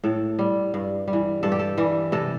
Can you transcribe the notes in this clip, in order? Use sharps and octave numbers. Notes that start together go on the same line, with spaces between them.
A2 A4
G3
G2
G3
E3
G2 A4
G4
A4
E3 G3
C3 A4